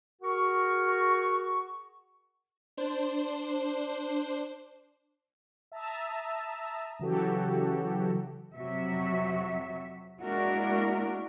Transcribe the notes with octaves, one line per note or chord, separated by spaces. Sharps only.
F#4 G#4 A#4 C#6
D4 C5
E5 A5 A#5 D#6 E6
C#3 E3 F#3 F#4 G4 A4
F2 C3 F#3 F#4 E5
G#3 A#3 D4 E4 F#4 A#4